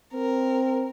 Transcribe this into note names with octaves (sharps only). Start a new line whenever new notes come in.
C4 A#4